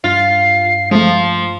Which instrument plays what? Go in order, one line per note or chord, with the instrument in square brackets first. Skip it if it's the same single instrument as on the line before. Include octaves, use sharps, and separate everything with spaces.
[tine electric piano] G2 [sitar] F4 [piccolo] C7
[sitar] F3 [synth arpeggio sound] G#3 A3 [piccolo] C6